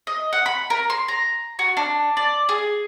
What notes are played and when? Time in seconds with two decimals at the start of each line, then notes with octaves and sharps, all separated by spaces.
0.07 D#5
0.33 F#5
0.46 B5
0.70 A#4
0.90 C6
1.08 A#5
1.59 F#4
1.77 D4
2.17 D5
2.49 G#4